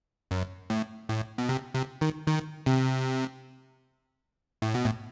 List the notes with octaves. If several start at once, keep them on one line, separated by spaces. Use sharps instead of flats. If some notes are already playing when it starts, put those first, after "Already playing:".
F#2
A2
A2
B2
C3
C3
D#3
D#3
C3
A2
B2
A2